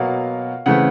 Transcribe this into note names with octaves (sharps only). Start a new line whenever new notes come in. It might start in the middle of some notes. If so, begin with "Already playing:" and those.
Already playing: B2 F#3 A#3 F5
C#3 E3 A3 C4 F#5